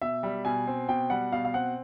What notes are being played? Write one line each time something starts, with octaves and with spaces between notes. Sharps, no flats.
B2 E5
G3
B2 G#5
C4
B2 G5
G3 F#5
B2 F5
F5
C4 F#5